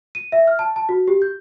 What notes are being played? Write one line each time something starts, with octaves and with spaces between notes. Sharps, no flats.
D#7
E5
F6
A5
A5
F#4
G4
G6